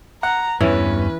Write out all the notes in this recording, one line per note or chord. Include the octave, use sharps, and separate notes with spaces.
F#5 A#5
E2 G2 E3 C#4 B4